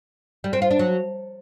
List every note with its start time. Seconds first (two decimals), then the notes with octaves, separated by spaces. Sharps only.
0.44 G3
0.53 C4
0.62 F4
0.70 D4
0.79 F#3